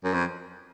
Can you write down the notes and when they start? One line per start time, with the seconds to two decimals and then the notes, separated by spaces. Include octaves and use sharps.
0.04 F#2
0.14 F2